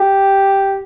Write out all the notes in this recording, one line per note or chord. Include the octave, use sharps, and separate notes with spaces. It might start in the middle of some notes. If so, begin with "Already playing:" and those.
Already playing: G4